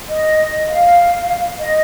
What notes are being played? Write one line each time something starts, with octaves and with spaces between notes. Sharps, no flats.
D#5
F5
D#5